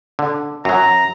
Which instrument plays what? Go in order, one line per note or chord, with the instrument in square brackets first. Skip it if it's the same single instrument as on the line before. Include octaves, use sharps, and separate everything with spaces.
[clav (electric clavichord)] D3
[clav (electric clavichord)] F#2 F#3 [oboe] A#5